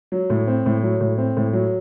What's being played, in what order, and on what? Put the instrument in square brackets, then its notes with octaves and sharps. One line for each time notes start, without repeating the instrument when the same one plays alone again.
[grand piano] F#3
A2
C4
A2
F#3
A2
C4
A2
F#3